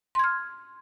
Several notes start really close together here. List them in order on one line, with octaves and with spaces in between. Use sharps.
C6 G#6 F6